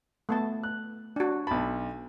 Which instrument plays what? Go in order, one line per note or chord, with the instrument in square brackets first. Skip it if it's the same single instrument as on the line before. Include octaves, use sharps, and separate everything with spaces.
[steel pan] A3 B3 A5
[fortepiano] F#6
[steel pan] D4 F#4
[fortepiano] B1 B5 [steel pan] A5